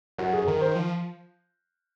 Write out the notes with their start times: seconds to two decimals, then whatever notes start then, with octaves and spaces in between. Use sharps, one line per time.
0.18 F#2 F#4
0.33 G#4
0.47 D#3 A#4
0.61 C5
0.76 F3